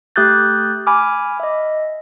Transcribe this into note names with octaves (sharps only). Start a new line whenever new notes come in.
A3 G4 D#6 F#6 G6 A6
G#5 B5 D6 F6
D#5 E5